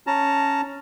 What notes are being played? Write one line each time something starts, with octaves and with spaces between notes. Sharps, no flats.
C#4 A5 A#5